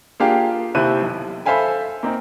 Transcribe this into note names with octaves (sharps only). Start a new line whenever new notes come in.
A#3 D4 F4 G4 G#4 F5
D#2 C3 E4 C5 F#6 D#7
B1
A4 C5 E5 F5 G#5 B5
A#3 C4 D#4